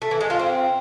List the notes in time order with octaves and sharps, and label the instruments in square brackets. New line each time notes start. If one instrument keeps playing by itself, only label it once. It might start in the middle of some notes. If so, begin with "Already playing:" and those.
[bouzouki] A3
E3
G#3
F4
C4